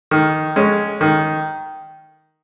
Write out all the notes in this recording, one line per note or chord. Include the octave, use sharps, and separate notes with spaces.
D#3
G#3 C#4
D#3